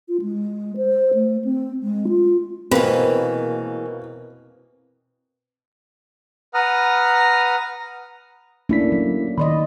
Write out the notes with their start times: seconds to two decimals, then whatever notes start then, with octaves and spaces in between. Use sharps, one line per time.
0.08 F4
0.21 G#3
0.77 C5
1.14 A3
1.44 C4
1.83 G#3
2.08 F4
2.71 B2 E3 G#3 A#3 C4 B4
6.54 B4 F#5 A#5 D#6 F6
8.69 A3 A#3 C#4 D4 E4 B6
8.92 F#3
9.38 D#3 D5 D#5 B5 C6